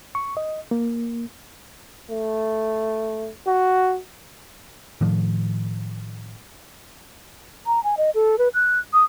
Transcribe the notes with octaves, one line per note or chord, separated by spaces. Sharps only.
C#6
D#5
A#3
A3
F#4
A2 D#3 F3
A#5
G#5
D#5
A4
B4
F#6
D#6